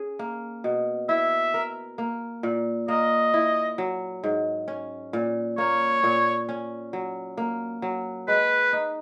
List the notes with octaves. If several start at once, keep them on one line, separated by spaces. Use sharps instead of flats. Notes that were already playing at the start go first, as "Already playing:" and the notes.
Already playing: C#4 G#4
A#3
B2
E4 E5
A#4
A#3
A#2
A#3 D#5
E4
F#3
G#2
C#4
A#2
A#3 C#5
A#2
C#4
F#3
A#3
F#3
G#3 B4
D#4